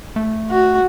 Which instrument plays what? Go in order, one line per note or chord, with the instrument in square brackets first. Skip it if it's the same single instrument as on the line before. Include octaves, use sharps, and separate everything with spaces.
[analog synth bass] A3
[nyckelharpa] F#4